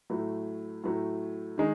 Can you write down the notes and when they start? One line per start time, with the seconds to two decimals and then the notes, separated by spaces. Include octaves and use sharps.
0.10 A2 F#3 A3
0.84 A2 F#3 A3
1.58 D#3 G#3